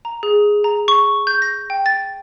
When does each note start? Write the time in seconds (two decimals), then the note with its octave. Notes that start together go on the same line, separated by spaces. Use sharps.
0.05 A#5
0.23 G#4
0.64 A#5
0.88 C#6
1.27 G6
1.42 A#6
1.70 G5
1.86 A6